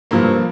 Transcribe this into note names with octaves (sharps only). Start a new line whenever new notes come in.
G2 F3 A#3